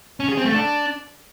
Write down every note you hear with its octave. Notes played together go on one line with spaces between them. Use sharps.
C#4
G#4
C4
A3
D4